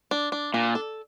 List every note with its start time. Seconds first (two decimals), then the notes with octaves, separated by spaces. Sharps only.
0.11 D4
0.32 D4
0.54 A#2 D4
0.75 A4